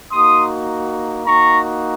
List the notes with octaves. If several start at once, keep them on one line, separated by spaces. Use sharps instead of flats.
A#3 D#4 F#4 C6 D#6
A#3 D#4 F#4 A#5 C#6